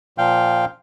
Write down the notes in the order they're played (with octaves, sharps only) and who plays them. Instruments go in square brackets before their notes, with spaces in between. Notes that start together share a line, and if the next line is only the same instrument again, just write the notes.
[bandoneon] A#2 F3 F5 G5